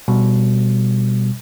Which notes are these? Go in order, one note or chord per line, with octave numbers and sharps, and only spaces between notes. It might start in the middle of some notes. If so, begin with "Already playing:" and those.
B2 G3